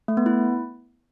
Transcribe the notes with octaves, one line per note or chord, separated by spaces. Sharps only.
A3
B3
E4